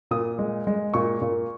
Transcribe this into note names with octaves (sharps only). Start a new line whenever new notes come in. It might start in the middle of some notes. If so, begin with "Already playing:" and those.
A#2 D#6
G#3
G#3
A#2 C#6
A#2